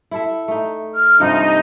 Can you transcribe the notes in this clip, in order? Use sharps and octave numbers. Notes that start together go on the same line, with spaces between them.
E4 A4 E5
A3 D#4
F6
G2 C3 F3 D#4